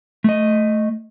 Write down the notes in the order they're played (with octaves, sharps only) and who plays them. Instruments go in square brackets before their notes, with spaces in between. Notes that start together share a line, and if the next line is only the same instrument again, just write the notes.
[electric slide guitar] A3 D#5